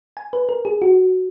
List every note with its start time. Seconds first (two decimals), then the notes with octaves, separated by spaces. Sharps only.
0.17 G#5
0.33 B4
0.49 A#4
0.65 G#4
0.82 F#4